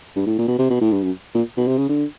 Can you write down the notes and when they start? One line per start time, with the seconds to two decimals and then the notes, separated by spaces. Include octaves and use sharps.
0.16 G2
0.26 A2
0.38 A#2
0.48 B2
0.59 C3
0.70 B2
0.81 A2
0.92 G2
1.03 F#2
1.35 A#2
1.57 B2
1.68 C3
1.78 C#3
1.89 D3